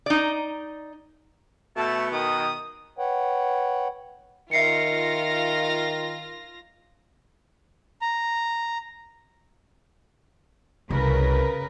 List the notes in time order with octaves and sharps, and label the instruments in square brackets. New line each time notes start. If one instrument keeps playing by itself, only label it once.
[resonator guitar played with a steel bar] D#4 D5
[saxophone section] B2 [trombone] A3 [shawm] A5
[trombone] D#3 [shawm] D#6
[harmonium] B4 C#5 F#5 G5
[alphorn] D#3 [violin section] F4 F5 A#6 [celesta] E5 C7 C#7
[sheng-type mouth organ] A#5
[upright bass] C2 [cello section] C#3 A#4 B4